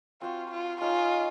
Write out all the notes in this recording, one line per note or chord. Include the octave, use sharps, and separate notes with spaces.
C4 F4 F#4 C5 F5
F4
D#4 F4 G#4 C#5 F5